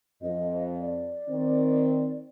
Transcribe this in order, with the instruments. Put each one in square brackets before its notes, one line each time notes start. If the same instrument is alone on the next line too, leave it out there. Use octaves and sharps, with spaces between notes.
[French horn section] F2 [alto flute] D#5
[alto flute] D5
[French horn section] D#3 C4